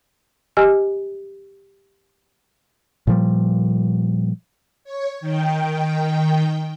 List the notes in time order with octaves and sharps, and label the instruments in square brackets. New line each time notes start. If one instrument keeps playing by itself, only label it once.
[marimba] G4 D#5 G#5 E6 F6
[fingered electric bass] A#2 F3 G3
[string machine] C#5
D#3 G5